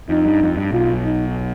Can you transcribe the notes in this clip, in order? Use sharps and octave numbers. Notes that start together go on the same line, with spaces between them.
F2 D#4
G2
F2
G2
B1 B2 F4
D#4